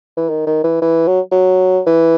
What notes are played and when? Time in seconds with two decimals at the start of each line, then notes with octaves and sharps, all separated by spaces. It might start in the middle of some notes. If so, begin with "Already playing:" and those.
0.17 E3
0.30 D#3
0.47 D#3
0.64 E3
0.82 E3
1.08 F#3
1.32 F#3
1.87 E3